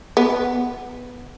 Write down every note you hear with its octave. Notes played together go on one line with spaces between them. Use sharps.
B3